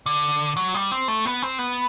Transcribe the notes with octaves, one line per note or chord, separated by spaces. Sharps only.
D3
F#3
G3
C4
A3
B3
C4
B3